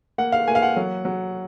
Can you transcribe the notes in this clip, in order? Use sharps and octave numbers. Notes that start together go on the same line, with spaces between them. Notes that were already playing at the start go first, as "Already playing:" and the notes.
A#3 F#5
F5
A#3 G#5
F5
F#5
F#3
F#3